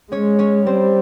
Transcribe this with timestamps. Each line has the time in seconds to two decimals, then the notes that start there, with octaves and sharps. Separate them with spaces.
0.12 G#3 C#4 C#5
0.39 C#4 C#5
0.66 G3 C4 C5